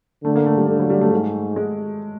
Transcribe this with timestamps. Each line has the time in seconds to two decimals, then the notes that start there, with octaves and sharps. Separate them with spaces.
0.24 D3 A3
0.36 A#3
0.46 A3
0.58 G3
0.69 D3
0.80 F#3
0.90 G3
1.01 A3
1.12 G#2
1.56 G#3